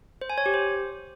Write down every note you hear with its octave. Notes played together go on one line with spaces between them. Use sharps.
C5
G#5
C#5
G4
C5